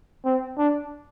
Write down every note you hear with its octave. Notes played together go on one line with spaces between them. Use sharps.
C4
D4